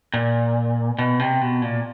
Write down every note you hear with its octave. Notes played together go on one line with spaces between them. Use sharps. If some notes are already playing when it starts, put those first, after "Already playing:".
A#2
B2
C3
B2
A#2